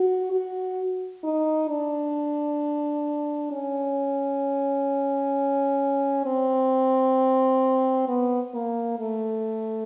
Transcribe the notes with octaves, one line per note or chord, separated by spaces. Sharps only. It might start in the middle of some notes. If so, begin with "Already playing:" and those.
Already playing: F#4
F#4
D#4
D4
C#4
C4
B3
A#3
A3